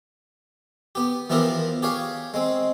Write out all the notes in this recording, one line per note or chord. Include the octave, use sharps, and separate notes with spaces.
B3 G4
E3 F3 B3 E4 G4 A#4
G4 G#4 C#5 F5
G#3 C4